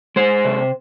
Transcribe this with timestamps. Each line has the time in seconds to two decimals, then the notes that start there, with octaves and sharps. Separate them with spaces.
0.16 G#3 C5
0.45 C3